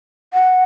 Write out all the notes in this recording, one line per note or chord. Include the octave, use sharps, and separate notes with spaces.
F#5